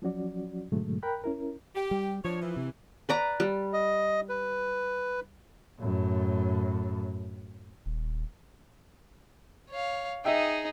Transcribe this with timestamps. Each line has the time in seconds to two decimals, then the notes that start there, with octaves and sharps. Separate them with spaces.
0.02 F3 F#3 C#4 F#4 D5
0.72 G#2 B2 D3 F#3 G#3 A3
1.03 A#4 G5 B5 F#6
1.24 C#4 E4 A#4
1.75 G4
1.91 G3
2.25 F3 D4 C#5
2.42 E3
2.57 C3
3.09 B4 D5 A#5
3.40 G3
3.73 D#5
4.29 B4
5.80 F#2 A2
7.86 D#1
9.70 C#5 F5
10.25 D#4 G#4 D#5 E5 G5